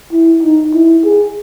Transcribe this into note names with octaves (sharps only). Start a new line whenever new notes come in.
E4
D#4
E4
G#4